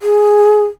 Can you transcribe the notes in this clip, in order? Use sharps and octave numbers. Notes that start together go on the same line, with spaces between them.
G#4